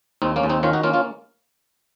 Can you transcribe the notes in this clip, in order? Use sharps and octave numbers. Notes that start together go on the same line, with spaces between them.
D#2 C4 D#4
A#3 C#4
D#2
C4 D#4
D#3 C#4 F4
D#4 F#4
A#3 C#4 F4
C#4 F4